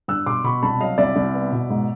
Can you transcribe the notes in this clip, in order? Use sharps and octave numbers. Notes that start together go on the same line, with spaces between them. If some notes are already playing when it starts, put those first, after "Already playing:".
G2 E6 F#6
B2 C6 D6
B2 B5 C#6
C2 A5 B5
F#3 D#5 F5
C2 D5 E5
C2
B3
B2
G#2